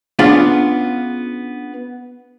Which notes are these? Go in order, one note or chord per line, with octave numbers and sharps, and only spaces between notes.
B3 C#4 D4 F4 G#4 B4